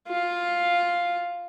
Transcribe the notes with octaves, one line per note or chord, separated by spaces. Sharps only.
F4